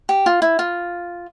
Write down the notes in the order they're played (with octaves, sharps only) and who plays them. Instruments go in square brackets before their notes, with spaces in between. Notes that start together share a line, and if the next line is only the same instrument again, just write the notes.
[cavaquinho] G4
F4
E4
F4